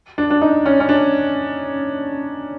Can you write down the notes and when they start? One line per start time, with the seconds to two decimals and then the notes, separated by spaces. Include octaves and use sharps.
0.18 D4
0.30 D4
0.42 D#4
0.66 C#4
0.80 C#4
0.89 D4